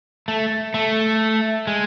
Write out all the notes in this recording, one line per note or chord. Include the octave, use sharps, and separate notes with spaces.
A3
A3
G#3